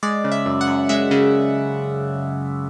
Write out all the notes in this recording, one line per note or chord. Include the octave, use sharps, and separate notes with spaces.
G#3 D5
C#3
E5
F#2
F#5
F#2
G#3 E5
C#3